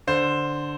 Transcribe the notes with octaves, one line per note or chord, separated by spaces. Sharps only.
D3 C5